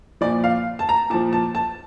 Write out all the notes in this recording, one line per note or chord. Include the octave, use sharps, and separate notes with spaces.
A#2 F3 D5
F5
A5
A#5
A#2 F3 A5
A5
A5